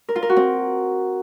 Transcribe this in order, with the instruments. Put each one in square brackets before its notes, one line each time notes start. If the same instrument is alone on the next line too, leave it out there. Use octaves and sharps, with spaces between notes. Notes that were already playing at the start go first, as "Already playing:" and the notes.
[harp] A#4
F4
A#4
F#4
C4